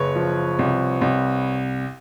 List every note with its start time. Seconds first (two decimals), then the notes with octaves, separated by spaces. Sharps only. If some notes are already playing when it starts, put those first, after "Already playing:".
Already playing: F#1 B4 C#5
0.16 F3
0.59 C2
1.01 C2